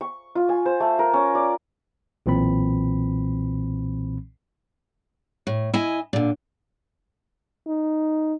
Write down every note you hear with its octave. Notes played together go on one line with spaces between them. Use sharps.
C#6
F4
G#5
C5
A3
A#4
C#4
D5
B1 A#2 E3 C4 B5
A2
E4 D#5 G#5
A#2 D3
D#4